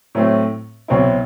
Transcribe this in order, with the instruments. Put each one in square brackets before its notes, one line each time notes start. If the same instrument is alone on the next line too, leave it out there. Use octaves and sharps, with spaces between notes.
[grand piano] A2 F#3 A3 C4
C2 B2 F#3 C4 E4